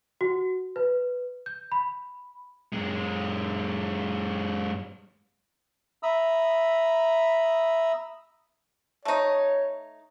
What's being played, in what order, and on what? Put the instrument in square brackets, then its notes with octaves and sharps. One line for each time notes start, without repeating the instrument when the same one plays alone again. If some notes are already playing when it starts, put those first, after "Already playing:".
[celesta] F#4
B4
G6
B5
[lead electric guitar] F#2 G#3
[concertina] E5 A#5 B5 D#6 E6
[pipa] A3 D#4 [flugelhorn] C#5